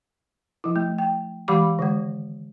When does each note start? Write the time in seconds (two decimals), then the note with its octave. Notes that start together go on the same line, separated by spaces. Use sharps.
0.64 F3 E4
0.76 A3
0.98 G5
1.48 E3 G#3 G4 F5 B5 D6
1.79 D3 D#3 G#3